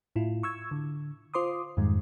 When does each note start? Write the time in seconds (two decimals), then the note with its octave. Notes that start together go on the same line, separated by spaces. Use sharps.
0.16 A2 E4 F4
0.43 C#6 E6 G#6
0.71 D3
1.34 F4 C5 C6 D6 D#6
1.77 F2 G#2 D#3 G3 G#3